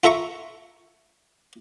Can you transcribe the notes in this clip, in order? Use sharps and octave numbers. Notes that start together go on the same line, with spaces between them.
F4 A4 E5 A#5 C#6